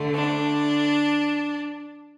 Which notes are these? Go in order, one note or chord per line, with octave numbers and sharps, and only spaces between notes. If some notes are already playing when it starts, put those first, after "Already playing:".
Already playing: D3 A3
D4